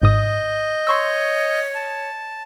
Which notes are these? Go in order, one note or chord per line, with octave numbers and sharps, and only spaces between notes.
G#1 G#2 D#5 D#6 G6
C#5 C6 C#6 E6
A5